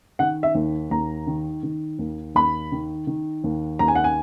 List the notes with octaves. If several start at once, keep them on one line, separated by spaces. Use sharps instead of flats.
D#3 F#5
E5
D#2
D#2 A#5
D#3
D#3
D#2
D#2 B5
D#3
D#3
D#2
D#2 A#5
G#5
F#5
G#5